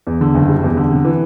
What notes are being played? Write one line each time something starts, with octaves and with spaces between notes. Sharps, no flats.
E2
D3
F#1
G3
E2
D3
C3
E3